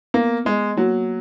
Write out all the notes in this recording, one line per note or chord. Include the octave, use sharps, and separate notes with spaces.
A#3 B3
G#3 B3
F#3 A#3